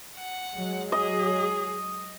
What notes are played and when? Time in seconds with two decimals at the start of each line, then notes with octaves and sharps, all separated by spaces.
0.17 F#5
0.56 F#3 G#3
0.92 G#4 D#5